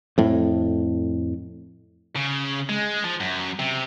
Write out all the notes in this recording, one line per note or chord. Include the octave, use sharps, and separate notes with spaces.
F2 A2
C#3
G#3
F3
F#2
C3